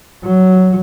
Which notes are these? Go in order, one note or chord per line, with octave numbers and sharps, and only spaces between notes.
F#3